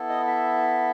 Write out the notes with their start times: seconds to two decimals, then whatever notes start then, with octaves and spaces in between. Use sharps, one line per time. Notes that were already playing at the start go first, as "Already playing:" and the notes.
Already playing: B3 E4 A4
0.09 D#5
0.27 E5